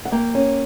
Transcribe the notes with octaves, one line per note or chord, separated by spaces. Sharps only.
F#5
A#3 G5
C#4